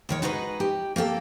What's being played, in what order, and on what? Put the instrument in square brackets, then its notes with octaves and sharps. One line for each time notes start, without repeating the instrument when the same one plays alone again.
[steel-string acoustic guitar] D#2 D#3 C#5
G#3 D#4 F#4 B4 D#5
G4
A#3 G4 A4 G5